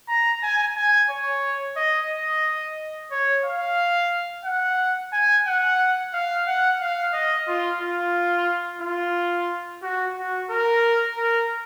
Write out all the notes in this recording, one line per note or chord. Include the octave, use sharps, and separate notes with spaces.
A#5
G#5
G#5
C#5
D#5
D#5
C#5
F5
F#5
G#5
F#5
F5
F#5
F5
D#5
F4
F4
F4
F#4
F#4
A#4
A#4